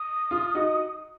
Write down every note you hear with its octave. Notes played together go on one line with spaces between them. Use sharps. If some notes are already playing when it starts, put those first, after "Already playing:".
Already playing: D#6
F4
D#4 F#4